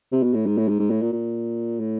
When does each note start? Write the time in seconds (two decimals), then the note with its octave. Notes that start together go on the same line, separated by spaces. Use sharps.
0.12 C3
0.23 B2
0.34 A2
0.46 G#2
0.57 A2
0.69 G#2
0.79 G#2
0.90 A2
1.02 A#2
1.13 A#2
1.80 A2